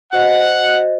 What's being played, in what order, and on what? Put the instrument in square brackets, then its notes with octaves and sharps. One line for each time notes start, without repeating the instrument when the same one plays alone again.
[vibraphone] F#4 C5 D#5 [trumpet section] F#5